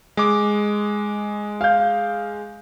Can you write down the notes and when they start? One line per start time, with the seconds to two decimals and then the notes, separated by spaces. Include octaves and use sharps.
0.17 G#3 D6
1.61 F5 G6